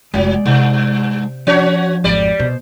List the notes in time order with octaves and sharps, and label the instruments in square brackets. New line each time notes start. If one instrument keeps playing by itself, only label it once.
[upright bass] F1 F4 [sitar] F#3 [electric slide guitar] G#3 D5
[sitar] G2 [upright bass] C3
[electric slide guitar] F3 [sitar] C#4 F#4 C#5
[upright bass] G#1 F2 [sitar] G3 D5
[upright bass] B2 [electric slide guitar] C5